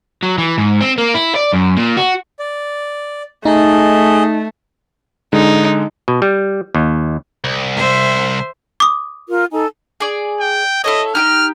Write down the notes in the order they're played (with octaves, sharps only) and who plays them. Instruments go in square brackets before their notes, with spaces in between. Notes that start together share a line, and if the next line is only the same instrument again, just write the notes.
[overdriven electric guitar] F#3
E3
G#2
C4
A#3
E4
D5
F#2
A#2
F#4
[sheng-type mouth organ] D5
[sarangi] A3 [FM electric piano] D#4 [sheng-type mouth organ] G#4 D#5
[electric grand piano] D3 G#3 [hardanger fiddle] D#4
[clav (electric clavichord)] B2
G3
D#2
[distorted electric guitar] C2
[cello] C5 E5
[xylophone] D6 D#6
[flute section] F4 A#4
D#4 A4 G#5
[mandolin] G#4 D5
[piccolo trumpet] G5
[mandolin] E4 A4 C#5 [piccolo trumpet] D#5
[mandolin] D#4 G4 G5 [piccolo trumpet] F6